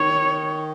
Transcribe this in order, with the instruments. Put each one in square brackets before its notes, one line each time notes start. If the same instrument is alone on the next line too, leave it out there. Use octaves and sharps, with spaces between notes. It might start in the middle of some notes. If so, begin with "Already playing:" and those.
Already playing: [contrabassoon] D#3 [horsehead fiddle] C#5